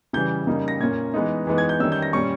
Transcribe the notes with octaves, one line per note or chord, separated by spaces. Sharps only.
C#3 E3 G3 G6
C#3 G3 A#3 D#4
A#6
A#2 A#3 C#4 G#6
E3 G#3 B3 D#4
E3 G#3 B3 D#4
G#6
G6
D#3 G3 C#4 E6
G6
A#6
A#2 G3 C#4 C#6